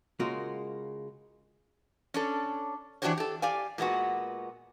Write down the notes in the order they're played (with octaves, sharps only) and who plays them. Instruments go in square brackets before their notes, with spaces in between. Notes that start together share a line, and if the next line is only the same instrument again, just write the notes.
[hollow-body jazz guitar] C#3 G#3 A#3 F4 F#4 A#4
[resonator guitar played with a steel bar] C#4 D4 A4
E3 D4 F#4 G4 C5 C#5
G4 A4
G4 D5 F5 G#5
A#2 G#3 B3 F#4